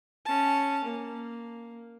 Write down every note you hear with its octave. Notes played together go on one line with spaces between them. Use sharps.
C#4 A5
A#3